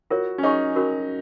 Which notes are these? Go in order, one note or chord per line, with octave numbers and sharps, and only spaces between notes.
F4 F#4 A#4 C#5
C#4
D#4 G#4 C#5 G#5 C#6
C#4 F#4 A#4